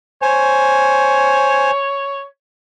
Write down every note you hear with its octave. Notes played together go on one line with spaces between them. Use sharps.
C5 C#5 G#5